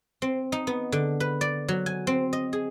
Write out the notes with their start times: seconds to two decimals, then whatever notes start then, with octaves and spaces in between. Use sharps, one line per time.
0.22 C4
0.52 D#4
0.67 B3
0.92 D3
1.20 B4
1.41 D5
1.68 F#3
1.86 G#5
2.07 C4
2.33 D#5
2.53 G#4